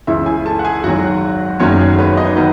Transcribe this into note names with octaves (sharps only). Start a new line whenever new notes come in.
C#2 C#3 E3 E4 E5
G#4 G#5
A4 A5
F#5
G#4 G#5
G#1 G#2 D#3 F#3 F#4 F#5
F#1 E2 D#3 F#3 C#4 C#5
G#4
B3 B4
D#4 D#5
D#3 F#3 B3 B4